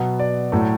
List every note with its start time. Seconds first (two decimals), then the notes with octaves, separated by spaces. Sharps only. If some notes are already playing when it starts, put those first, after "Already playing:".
Already playing: B2 F#3 B3
0.20 D5
0.52 A2 F#3 A3